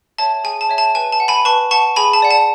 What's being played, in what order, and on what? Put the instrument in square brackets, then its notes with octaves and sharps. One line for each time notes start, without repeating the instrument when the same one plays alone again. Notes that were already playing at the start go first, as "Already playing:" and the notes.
[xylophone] C#5 E5 A5
G#4 G#5
A5
C#5 E5
A5
B4 G#5
A5
F#5
G#5 B5
B4 A5 C#6
F#5 A5 C#6
G#4 G#5 B5
A5
D5 F#5
A5